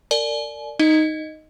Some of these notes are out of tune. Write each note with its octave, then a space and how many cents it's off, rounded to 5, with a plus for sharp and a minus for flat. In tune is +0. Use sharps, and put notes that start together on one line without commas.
A#4 -35 D5 +0 G#5 +40
D#4 +0 D#5 +0